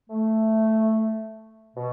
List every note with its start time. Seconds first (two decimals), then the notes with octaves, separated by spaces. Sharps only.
0.09 A3
1.77 B2